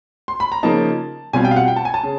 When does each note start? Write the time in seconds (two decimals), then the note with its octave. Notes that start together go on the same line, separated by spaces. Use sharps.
0.28 C6
0.40 B5
0.52 A#5
0.63 C#3 F3 A#3 D#4 A5
1.33 B2 G3 C4 F4 G#5
1.45 G5
1.51 F5
1.56 F#5
1.68 G5
1.76 A5
1.85 G#5
1.94 A5
2.03 C#3